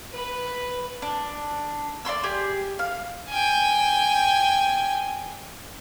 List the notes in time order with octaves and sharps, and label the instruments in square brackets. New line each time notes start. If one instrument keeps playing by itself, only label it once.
[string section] B4
[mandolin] D4
D5 F5 C6 E6
G4 G#4
F5
[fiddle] G5 G#5